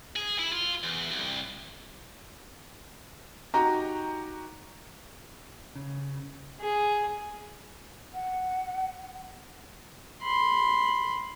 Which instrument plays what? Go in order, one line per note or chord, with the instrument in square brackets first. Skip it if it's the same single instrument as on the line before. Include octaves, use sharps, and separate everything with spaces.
[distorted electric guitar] G#4
E4
F4
E2
C2
[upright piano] D#4 F#4 G4 [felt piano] A#5
[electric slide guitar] C#3
[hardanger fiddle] G#4
[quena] F#5
[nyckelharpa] B5 C6